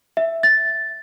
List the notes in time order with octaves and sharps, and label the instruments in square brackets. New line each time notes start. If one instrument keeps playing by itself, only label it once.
[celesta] E5
A6